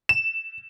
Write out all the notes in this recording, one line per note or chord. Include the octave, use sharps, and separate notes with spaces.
E7